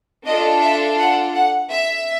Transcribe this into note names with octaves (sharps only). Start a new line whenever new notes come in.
D4 F4 A4 D#5
E5
F#5
F#5
E5